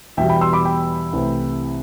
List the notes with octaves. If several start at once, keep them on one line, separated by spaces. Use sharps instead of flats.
E2 B2 G3 E5 G5
G5 B5
C6 E6
B5 D6
G5 B5
C2 C3 E3 A3